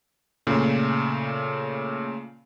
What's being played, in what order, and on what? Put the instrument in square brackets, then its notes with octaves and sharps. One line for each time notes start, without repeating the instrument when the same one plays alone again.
[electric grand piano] A#2 C#3 A3